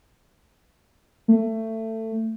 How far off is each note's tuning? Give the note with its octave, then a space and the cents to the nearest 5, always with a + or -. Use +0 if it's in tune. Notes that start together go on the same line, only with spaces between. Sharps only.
A3 +20